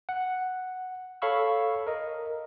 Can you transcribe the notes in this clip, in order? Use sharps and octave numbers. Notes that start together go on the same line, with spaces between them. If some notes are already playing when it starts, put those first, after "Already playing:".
F#5
A4 C#5 F5 B5 C#6 E6
A#4 D#5